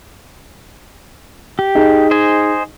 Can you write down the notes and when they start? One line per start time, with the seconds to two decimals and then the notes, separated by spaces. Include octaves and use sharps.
1.59 G4
1.75 D#4 G#4
2.11 C5 D#5 G#5